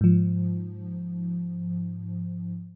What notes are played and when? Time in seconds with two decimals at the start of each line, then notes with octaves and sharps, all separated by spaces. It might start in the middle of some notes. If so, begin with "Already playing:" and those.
0.01 G#2 F3